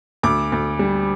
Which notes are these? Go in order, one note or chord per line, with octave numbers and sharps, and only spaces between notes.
D2 D6
D2
G3